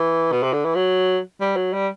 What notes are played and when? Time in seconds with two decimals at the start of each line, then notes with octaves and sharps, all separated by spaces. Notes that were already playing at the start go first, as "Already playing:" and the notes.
Already playing: E3
0.32 B2
0.43 C3
0.53 D3
0.64 E3
0.75 F#3
1.41 G3
1.56 F#3
1.73 G3